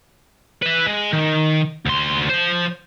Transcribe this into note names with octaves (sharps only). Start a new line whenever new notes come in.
B4 E5
G#3
D#3
D2 C6
F3 C5